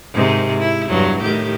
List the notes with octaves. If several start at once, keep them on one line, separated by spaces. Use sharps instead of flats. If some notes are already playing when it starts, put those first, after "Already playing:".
G#2 C3 D#3
E4
E2 G2 F#3
A2 D#3 G4